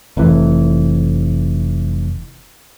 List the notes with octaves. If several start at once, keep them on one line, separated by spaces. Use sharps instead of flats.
F1 E3